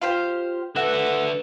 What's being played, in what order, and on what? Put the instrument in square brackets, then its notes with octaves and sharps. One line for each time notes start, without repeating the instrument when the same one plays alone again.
[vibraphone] F4 [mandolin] G4 C5 F5
[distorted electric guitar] D3 E5 [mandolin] F#4 [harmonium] A4 [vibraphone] B4